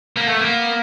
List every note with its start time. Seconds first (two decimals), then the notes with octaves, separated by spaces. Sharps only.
0.16 A#3 B3
0.29 A3
0.41 A#3 B3